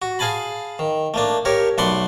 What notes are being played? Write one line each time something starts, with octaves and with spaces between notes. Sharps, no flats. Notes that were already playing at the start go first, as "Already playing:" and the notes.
F#4
G#4 F5 G#5 A5 B5
D#3
A3 A#3 D4
G4 A#4 C#5 E5
B1 A3 D5 F#5 B5 C6